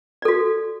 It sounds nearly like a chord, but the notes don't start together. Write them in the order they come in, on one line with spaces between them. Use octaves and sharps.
D5 A4 F#4